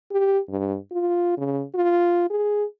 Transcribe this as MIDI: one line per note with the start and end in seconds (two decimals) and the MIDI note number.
0.11 0.39 67
0.49 0.76 43
0.92 1.36 65
1.38 1.63 49
1.75 2.28 65
2.30 2.64 68